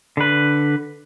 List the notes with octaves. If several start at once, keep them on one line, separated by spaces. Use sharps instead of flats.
D3 B4